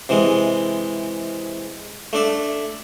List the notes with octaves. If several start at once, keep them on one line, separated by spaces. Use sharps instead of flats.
C3 E3 G#3
A3 D4 D5 E5